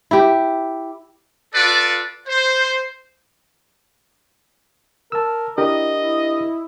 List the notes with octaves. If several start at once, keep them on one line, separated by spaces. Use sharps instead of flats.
E4 G4
F4 A4 B4 D5
C5
A#4 A5 E6
D4 E4 G4 A#4 D#5
E4